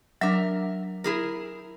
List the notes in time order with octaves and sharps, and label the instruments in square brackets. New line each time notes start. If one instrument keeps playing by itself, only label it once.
[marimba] F#3 D4 [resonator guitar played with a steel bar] A#4 E5
[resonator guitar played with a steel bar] E4 G#4 A#4